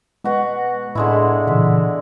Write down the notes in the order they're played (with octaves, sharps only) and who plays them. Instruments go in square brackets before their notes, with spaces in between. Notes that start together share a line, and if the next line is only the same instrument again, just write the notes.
[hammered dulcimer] B2 F#4 [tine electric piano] G#3 B4
[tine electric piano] A2 [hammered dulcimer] D3 G#3 E4
[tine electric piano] A#2 C#3 E3 [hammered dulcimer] E5